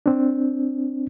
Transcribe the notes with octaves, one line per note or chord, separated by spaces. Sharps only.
C4 D4